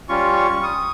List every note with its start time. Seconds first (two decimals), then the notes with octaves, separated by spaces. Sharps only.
0.09 G3 C#4 F4 C#6
0.36 C#6
0.63 D#6